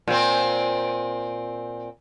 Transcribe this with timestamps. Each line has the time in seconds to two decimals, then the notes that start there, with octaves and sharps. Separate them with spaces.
0.08 A#2 C4